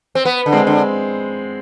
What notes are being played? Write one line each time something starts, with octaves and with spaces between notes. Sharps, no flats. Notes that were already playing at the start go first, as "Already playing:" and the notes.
C4
B3
D3
G#3 C4
D3